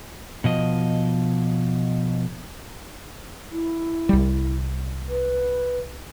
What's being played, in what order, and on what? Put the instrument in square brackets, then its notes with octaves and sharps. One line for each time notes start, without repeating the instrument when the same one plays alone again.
[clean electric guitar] B2 F3 D#5
[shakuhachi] E4
[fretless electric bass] C2 G3
[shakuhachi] B4